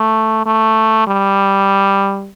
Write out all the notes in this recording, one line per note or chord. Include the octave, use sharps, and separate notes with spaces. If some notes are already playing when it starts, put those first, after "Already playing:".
Already playing: A3
A3
G3